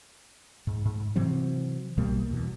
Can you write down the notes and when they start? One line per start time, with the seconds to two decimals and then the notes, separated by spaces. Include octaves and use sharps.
0.67 G#2
0.85 G#2
1.16 C3 E3 F#3 C4
1.97 B1 B2 G3 A#3
2.31 E2 B2